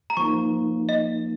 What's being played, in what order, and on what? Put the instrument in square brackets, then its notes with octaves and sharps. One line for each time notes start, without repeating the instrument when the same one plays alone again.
[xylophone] A#5
[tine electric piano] F3 A#3 D#4 [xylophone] C#6
[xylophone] D#5